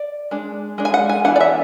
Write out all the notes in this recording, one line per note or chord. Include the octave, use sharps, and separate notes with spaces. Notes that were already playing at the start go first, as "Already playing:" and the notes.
Already playing: D5
G#3 D4
G#3 D4
G#5
F#5
G#5
E3 B3 D4 F#5
D5
E5